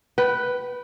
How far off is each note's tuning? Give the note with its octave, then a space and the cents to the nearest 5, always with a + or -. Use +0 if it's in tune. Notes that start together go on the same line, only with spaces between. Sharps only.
B4 +0 G5 -40